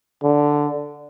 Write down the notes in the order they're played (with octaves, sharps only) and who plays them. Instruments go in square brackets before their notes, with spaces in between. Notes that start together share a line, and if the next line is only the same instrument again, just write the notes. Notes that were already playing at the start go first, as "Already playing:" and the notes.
[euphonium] D3